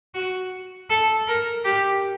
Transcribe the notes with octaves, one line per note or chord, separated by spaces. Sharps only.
F#4
A4
A#4
G4